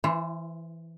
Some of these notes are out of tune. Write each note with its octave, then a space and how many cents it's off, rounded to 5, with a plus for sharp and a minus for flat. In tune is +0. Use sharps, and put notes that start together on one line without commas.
E3 +0 E4 +40 C5 +0